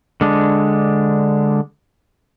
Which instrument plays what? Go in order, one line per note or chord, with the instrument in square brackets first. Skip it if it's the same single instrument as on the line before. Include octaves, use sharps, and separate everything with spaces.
[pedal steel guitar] D3 G#3 D4